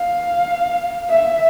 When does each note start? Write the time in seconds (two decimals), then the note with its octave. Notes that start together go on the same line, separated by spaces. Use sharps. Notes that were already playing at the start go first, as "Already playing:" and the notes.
Already playing: F5
1.09 E5